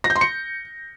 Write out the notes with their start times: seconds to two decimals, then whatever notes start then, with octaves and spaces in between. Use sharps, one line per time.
0.04 A#6
0.10 G6
0.16 C6
0.21 C#7